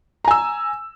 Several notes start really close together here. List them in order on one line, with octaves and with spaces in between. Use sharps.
A#5 G#5 E6